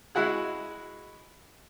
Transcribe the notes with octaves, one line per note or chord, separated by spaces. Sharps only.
G#3 E4 F#4 G#4